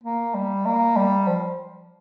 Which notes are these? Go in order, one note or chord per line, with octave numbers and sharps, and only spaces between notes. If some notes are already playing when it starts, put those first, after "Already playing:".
A#3
G3
A#3
G3
F3